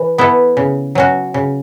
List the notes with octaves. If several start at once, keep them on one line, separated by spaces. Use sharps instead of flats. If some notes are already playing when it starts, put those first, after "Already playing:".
Already playing: E3
B3 E4 A4
C#3
F#3 C#4 F#4
C#3